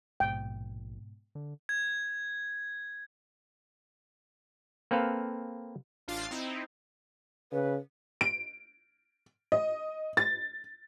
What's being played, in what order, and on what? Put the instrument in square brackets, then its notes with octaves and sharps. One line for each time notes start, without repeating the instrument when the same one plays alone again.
[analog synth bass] A#1 [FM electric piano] G#2 B2 [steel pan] G5
[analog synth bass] D3
[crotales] G#6
[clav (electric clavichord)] A#3 C4 A4 B4 F5
[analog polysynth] A1 D4 F4 F5 A6 C7
C4 D#4 E4
[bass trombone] C#3 [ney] B4
[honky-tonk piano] D7
D#5
A6